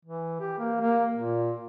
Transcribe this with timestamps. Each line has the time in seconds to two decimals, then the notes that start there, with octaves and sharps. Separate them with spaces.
0.05 E3
0.40 G4
0.58 A#3
0.81 A#3
1.15 A#2